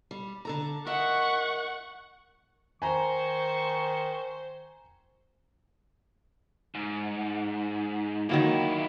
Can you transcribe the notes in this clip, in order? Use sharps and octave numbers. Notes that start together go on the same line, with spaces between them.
G3
D3 A4 A#5
A#4 D#5 E5 F#5 C#6
D#3 C5 G#5 A#5 C#6
G#2
D#2 D#3 F#3 A#3 E4